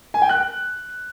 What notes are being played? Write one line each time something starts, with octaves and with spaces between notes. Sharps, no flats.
G#5
G5
F#6